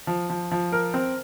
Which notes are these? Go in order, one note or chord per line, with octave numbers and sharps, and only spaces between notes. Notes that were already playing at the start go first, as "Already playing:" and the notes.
F3
F3
F3
A#4
C4